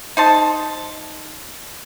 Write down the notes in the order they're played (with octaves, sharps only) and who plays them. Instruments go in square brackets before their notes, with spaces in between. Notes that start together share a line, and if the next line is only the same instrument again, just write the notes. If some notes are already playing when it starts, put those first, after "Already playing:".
[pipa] D#4 C5 A5